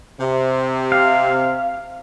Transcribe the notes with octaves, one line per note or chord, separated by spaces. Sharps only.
C3
F5